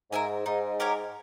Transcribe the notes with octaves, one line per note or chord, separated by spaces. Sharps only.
G#2 A#4 E5 G#5
G#2 D#4
G4 A#4 C#5